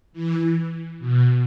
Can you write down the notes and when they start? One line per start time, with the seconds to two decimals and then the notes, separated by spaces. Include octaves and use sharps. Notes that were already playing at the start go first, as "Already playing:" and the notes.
0.13 E3
0.99 B2